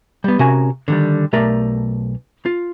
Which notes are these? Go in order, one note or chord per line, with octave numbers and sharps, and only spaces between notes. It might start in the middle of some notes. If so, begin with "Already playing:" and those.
G3 B3
C3 C#4 F#4 A#4 G#5
D3 D#3 G3
B1 A3 G4 A#4 D5
F4